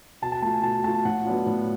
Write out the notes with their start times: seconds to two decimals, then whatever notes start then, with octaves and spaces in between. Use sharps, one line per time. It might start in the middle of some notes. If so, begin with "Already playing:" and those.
0.22 B2 A5
0.32 A5
0.42 A3 F4 A5
0.53 G#5
0.63 B2 A5
0.84 A3 A5
0.87 F4
1.05 A2 F#5
1.24 F#3 B3 D4 F4
1.46 A2